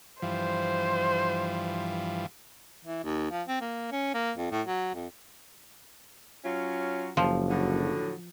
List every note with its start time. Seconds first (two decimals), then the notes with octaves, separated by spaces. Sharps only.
0.22 G2 E3 F3 C5
2.85 E3
3.04 D#2
3.31 F3
3.48 C4
3.61 A#3
3.92 C#4
4.14 A#3
4.37 F2
4.52 A2
4.67 F#3
4.94 F2
6.44 F#3 C#4 F4
7.17 F#1 F3
7.50 A2 D3 F#3